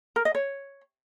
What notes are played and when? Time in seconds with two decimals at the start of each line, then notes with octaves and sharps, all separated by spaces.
0.16 A#4
0.25 D#5
0.35 C#5